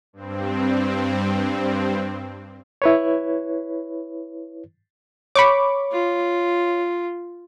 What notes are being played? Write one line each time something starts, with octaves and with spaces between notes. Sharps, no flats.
G2 C4
E4 B4 C#5
C#5 B5 C#6 D6
F4